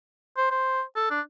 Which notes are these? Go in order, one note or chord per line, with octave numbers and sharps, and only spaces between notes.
C5
C5
A4
D4